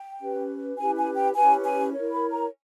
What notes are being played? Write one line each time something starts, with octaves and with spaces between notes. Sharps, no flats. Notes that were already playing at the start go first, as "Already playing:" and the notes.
Already playing: G5
C#4 G4 B4
C#4 E4 G4 B4 G#5
G#5
G5
C#4 E4 G4 B4 G#5
G#5
E4 A#4 C#5
B5
A#5